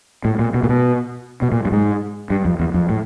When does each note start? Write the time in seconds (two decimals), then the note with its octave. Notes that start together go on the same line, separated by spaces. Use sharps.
0.25 A2
0.39 A#2
0.54 B2
0.63 A#2
0.69 B2
1.42 B2
1.52 A#2
1.65 G2
1.72 G#2
2.30 G2
2.45 F2
2.60 E2
2.74 F2
2.89 A2